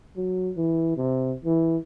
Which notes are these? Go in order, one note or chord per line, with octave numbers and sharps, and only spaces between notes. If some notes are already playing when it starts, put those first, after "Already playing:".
F#3
E3
C3
E3